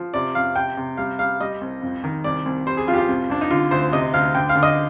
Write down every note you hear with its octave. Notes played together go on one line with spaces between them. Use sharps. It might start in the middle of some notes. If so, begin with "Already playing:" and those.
Already playing: F3
C3 D5
F2 F5
C3 G5
C3
G3 F5
G3 F5
G3 D#5
C2
F2
D#3
C2 D5
C2
G3 C5
G#4
F2 F4
G4
F4
C2
C2 D4
D#4
D3 F4
D2 C5
C3 D#5
D2 F5
D3 G5
F5
D3
D#5